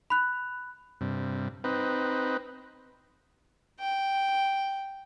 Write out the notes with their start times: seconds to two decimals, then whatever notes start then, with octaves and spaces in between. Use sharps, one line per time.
0.10 B5 F#6
1.01 G2 C3
1.64 C4 D#4 B4
3.80 G5